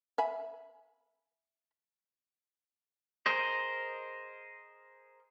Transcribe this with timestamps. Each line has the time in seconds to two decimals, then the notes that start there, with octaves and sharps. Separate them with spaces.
0.18 E5 G#5 B5
3.26 G#4 A#4 C5 D#5